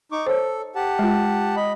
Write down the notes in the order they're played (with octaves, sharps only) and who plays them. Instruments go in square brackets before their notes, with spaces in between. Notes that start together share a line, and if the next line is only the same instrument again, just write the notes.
[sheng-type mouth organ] D#4 C#6 D6
[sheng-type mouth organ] A4 [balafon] C5 C#5
[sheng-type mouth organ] G4 F#5 A5
[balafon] G#3 F4
[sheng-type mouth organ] D#5 B5